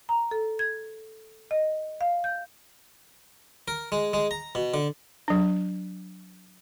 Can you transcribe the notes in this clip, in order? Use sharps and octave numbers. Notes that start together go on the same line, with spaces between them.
A#5
A4
G#6
D#5
F5
G6
A#4
G#3
G#3
A#5
B2
D3
F#3 D4